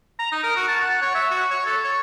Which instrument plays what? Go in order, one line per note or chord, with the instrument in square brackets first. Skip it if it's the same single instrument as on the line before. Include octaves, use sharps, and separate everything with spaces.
[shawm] A#5
D#4
A#4
F#4
A5
F#5
C#5
E5
F#4
C#5
A4
C#5